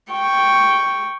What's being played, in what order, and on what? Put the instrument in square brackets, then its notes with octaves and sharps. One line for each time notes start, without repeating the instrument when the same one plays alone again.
[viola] G5 C#6